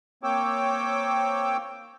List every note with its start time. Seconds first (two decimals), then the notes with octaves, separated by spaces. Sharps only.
0.23 A#3 C4 C#5 G5 D6 E6